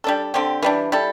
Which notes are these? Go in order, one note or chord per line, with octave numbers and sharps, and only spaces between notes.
G3 D4 A4
D3 C4 G4
E3 G3 D4
G3 E4 A4